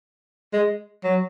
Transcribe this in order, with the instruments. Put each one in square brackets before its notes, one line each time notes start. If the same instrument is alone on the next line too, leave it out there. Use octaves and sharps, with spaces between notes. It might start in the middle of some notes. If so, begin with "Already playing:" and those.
[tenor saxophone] G#3
F#3